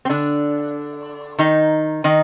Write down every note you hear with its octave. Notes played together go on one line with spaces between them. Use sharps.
C4
D3 D4
D#3 D#4
D#3 D#4